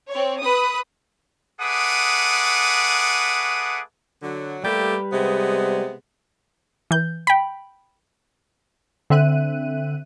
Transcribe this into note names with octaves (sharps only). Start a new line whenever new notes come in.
C4 C#5
B4 D#6
A3 G#4 B4 F#5 D6 D#6
D3 F#3
G3 A3 A#3 G4 B4
C3 G#3 B3
E3 G6
G5 B5
D3 C4 E5 F#6 D#7